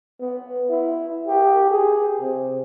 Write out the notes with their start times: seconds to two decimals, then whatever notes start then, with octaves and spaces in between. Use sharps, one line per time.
0.21 B3
0.70 E4
1.28 G4
1.71 G#4
2.21 C3